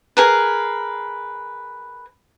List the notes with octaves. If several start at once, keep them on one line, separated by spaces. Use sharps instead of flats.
G#4 A#4 B4